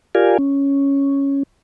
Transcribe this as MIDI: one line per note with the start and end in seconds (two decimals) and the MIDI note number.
0.15 0.38 65
0.15 0.38 67
0.15 0.38 70
0.15 0.38 74
0.15 0.38 77
0.15 0.38 80
0.39 1.43 61